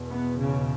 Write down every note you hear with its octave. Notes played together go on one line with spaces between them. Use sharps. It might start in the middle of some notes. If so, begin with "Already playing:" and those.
Already playing: E2 B2
B3
C#3